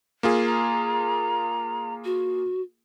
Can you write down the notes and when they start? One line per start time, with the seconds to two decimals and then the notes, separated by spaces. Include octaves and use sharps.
0.23 A#3 F4 G#4
0.46 A#5
2.05 F#4